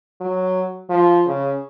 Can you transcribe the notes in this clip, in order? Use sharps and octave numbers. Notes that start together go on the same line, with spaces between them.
F#3
F3
C#3